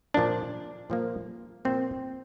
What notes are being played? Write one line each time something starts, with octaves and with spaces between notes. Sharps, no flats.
A#2 F3 A#3 D4
A#2 F3 A#3
A#2 F3 A#3 C4